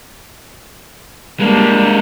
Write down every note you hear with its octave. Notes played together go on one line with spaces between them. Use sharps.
G3 G#3 A#3 D4